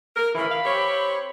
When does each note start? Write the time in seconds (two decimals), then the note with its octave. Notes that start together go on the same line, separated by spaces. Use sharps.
0.16 A#4
0.35 A2 C#3 E3 B5
0.49 F5
0.65 C4 G4 C#5